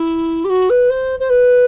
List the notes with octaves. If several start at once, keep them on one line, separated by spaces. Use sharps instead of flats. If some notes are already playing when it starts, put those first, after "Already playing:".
Already playing: E4
G4
F#4
B4
C5
C5
B4